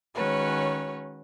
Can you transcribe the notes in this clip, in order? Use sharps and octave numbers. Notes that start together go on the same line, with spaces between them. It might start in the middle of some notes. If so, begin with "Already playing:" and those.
D#3 G#3 C#4 F#4 B4 C#5